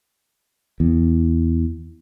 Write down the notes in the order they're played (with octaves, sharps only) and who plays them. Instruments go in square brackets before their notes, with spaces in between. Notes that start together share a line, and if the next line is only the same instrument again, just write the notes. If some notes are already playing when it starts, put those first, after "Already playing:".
[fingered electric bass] E2